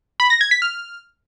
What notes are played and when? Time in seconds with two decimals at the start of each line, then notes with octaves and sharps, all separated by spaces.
0.20 B5
0.30 A#6
0.41 G#6
0.51 B6
0.62 F6